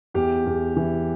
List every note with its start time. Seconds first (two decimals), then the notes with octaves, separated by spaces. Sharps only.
0.14 E2 G4
0.46 E2
0.76 E3